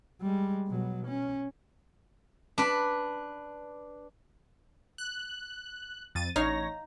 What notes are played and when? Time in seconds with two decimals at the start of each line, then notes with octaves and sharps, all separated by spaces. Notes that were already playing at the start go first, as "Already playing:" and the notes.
0.21 G3 G#3
0.67 B2 F#3
1.06 C#4
2.58 D4 B4
4.98 F#6
6.15 F2 A6 D#7
6.36 A1 D#4 C#5 F5 A#6